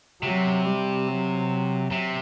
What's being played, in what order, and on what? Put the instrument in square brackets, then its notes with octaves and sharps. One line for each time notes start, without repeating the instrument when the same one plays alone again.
[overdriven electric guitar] C3 [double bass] F#3
[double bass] G3
F#3
[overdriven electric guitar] C3